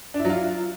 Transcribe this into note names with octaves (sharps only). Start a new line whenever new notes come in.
D4
E4
F#3
F4